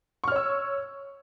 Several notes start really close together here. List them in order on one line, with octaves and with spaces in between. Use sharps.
C#6 F6 C#5 E6